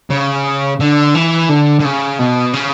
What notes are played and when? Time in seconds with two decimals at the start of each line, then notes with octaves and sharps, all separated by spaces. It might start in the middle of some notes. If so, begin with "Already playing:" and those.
0.10 C#3
0.80 D3
1.15 E3
1.49 D3
1.80 D3
1.85 C#3
2.19 B2
2.54 C#3